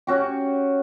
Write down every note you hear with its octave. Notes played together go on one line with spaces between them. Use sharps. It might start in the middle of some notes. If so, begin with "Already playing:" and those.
C#4 F#4 G4